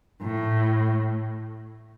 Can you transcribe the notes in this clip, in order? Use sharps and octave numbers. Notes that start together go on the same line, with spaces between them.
A2